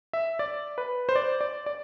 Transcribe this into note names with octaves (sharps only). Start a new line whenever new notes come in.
E5
D5
B4
C5
D5
D5
D5